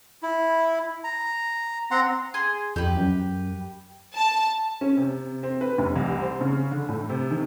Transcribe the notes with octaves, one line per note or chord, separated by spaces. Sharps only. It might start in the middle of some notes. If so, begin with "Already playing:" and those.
E4
A#5
C4 F#5 A#5 C6
G#4 C6
F2 G4 B4
F#2
A5
C#4
C3
C4
B4
F1
C2
C5
C#3
D3
A2
C3
D#3